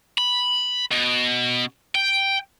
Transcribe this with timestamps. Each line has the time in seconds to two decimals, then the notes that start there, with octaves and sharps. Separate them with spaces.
0.18 B5
0.92 B2
1.95 G5